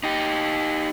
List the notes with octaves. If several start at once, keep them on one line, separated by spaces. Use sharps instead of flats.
D#4 G4